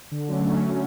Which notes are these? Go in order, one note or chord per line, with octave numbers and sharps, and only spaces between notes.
D3
F#3 A3 C#4